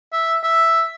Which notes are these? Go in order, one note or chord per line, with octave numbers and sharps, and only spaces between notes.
E5
E5